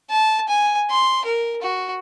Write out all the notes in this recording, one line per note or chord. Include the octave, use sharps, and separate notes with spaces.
A5
G#5
C6
A#4
F#4